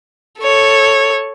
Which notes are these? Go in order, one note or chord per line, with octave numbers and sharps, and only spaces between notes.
A4 C#5